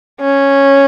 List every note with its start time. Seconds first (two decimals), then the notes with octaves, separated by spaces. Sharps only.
0.21 C#4